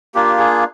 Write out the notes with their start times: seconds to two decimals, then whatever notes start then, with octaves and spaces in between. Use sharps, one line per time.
0.15 A#3 D4 F4 G4
0.38 G#4